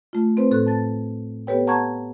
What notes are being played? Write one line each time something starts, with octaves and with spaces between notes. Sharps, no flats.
A3 F4
C4 B4 C5
A2 A4 F#6
A5 A6
B3 G4 A4 B4 C#5 G5
F#5 A5 A#5 C#6 G#6